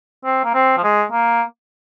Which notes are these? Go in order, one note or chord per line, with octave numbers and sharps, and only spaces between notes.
C4
A#3
C4
F3
G#3
A#3